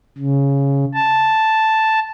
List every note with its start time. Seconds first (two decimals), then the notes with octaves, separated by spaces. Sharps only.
0.18 C#3
0.94 A5